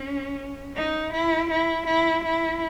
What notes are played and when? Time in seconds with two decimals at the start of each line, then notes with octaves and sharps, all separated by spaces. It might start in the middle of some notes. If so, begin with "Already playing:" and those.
Already playing: C#4
0.76 D#4
1.13 E4
1.50 E4
1.87 E4
2.25 E4